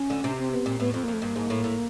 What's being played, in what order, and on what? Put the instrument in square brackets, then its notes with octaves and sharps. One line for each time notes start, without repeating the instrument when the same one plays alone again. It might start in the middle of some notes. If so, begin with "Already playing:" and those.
Already playing: [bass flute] C#4
[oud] D2 D3
C3
[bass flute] C4
B3
[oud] A#2 [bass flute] C4
[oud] A2 [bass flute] B3
[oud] F2 [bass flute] C4
[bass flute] A#3
[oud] F2
[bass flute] A3
[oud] G2 [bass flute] A#3
[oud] G#2
A2
A2